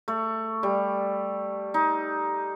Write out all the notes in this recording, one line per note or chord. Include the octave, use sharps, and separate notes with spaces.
A3
G3
D#4